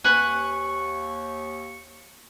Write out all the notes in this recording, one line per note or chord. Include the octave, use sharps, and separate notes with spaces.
D#2 B4 F#5 G#5 C#6